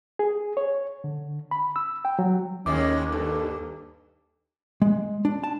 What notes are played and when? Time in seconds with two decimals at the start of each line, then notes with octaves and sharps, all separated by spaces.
0.19 G#4
0.57 C#5
1.04 D3
1.51 B5
1.76 E6
2.05 G5
2.19 F#3
2.66 D#2 A2 D#3 G#3 C#4 D6
3.12 G2 A4
4.82 G#3
5.25 D4
5.44 A5